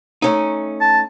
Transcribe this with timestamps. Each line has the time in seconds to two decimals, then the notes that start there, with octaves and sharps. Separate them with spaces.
0.22 A3 C#4 D#4
0.81 A5